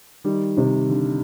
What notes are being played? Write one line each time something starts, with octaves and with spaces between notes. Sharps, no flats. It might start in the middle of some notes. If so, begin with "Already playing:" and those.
D#3 G3
C3 D#3
D3